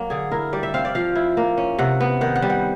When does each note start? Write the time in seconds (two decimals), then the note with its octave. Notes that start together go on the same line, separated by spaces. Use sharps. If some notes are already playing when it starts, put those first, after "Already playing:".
Already playing: F#3 A#3
0.10 D3 G#4
0.32 E4 A#4
0.53 G3 D5
0.63 E5
0.74 C4 F5
0.85 D5
0.95 F3 F5
1.15 E4
1.37 A#3
1.57 C#4
1.79 C3 F#5
2.01 B3
2.21 D#3 F#5
2.36 F#5
2.42 G3
2.50 F#5